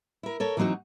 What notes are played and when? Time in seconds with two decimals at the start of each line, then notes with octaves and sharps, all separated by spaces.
0.23 E4 A#4
0.40 A4 A#4 C#5
0.57 E3 F#3 B3 C4 D#4 F#4